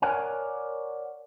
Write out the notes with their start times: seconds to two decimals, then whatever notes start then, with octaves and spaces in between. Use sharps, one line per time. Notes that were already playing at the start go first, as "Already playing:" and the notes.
0.02 A#4 C#5 D5 F#5 G#5 A#5